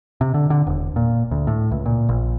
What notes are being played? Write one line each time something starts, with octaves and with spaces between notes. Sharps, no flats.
C3
D3
D3
E1
A#2
D2
A2
C#2
A#2
A#1